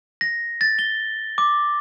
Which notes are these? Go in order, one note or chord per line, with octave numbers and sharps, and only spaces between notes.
A#6
A6
G7
D6